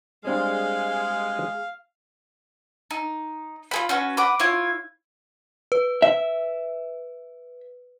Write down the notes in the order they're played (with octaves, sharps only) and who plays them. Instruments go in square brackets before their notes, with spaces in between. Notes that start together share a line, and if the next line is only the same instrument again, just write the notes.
[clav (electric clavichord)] G3 C4 D4 [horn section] G#3 [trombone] G#4 [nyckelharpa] F5
[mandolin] D#4
F4 G#4 B5
C#4 F#4 B4
B4 F#5 D6
E4 F4 C#5
[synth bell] B4
[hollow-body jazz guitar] E5